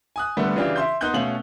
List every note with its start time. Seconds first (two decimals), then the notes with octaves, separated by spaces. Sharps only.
0.16 G#5 D#6 F#6
0.37 D3 G3 A3 B3
0.56 C#3 E3 D4 F4 G4
0.76 E5 C6 G6
1.01 B3 D#4 C6 F#6 G6 G7
1.14 B2 A3 C#4 F5 F#7